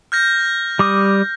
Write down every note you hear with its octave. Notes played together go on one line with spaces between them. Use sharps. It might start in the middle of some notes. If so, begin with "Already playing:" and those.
F6 G6 A#6
G3 D6 D#6